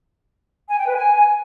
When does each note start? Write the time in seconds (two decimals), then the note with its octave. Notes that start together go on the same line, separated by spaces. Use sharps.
0.69 G#5
0.78 G5
0.86 B4
0.95 G#5